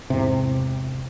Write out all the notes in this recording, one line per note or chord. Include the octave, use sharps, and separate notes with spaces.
E2 G#2 C3